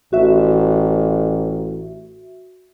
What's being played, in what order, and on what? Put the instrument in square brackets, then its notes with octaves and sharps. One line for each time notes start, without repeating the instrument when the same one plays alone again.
[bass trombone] A1 [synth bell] F#4 E5